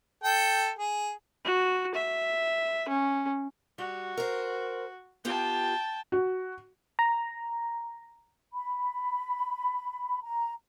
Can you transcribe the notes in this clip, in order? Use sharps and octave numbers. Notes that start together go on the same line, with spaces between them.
A4 G5
G#4
F#4
E5
C#4
G3 F#4
A#4 C5
B3 F4 G4 G5 A5
F#4
A#5
B5
A#5